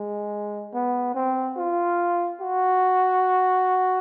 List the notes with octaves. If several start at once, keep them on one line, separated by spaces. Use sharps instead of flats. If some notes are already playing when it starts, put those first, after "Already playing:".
Already playing: G#3
B3
C4
F4
F#4